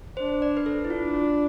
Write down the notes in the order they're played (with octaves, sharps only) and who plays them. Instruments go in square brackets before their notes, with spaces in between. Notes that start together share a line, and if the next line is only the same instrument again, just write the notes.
[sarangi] D4 [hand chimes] C5
[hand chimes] D5
B4
A4
E4
[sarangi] D4 [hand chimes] F4
[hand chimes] F4